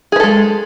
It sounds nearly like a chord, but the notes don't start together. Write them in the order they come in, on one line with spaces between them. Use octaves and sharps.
G#4 B4 A4 G#3